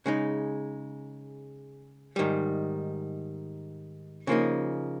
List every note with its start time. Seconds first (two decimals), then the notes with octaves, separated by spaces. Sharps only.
0.06 C#3 G#3 D#4
2.16 G#2 D#3 G3
4.27 C#3 F3 A#3 D#4